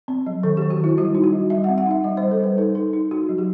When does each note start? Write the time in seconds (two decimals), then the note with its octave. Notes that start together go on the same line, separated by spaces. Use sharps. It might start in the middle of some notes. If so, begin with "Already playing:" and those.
0.08 C4
0.26 F#3
0.43 D#3 A4
0.57 G4
0.62 D#3
0.70 F#4
0.80 D#3 E4
0.98 G3 F#4
1.15 D#4
1.24 F#4
1.33 G3
1.50 G3 E5
1.64 F#5
1.69 C4
1.78 F#5
1.87 D#4 E5
2.04 G3 D#5
2.17 C5
2.22 G3
2.31 A4
2.40 G3 B4
2.57 D#4 A4
2.75 D#4 A4
2.93 D#4
3.11 D#4 F#4
3.29 F#3
3.38 G4